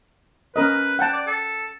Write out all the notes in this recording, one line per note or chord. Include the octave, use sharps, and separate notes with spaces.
C#4 A#4 B4 D#5
F#5 G5 A5
D5
A4